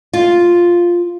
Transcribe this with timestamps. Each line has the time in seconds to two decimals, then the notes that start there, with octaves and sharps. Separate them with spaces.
0.13 F4